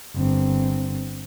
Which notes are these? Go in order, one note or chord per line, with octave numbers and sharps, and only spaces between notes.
G1 C4